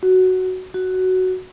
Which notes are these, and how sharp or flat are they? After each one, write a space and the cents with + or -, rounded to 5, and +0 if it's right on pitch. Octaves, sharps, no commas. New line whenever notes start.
F#4 +5
F#4 +5